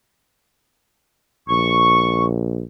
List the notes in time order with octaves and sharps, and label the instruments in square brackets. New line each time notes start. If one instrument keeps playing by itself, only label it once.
[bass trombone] A#1 [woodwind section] C#6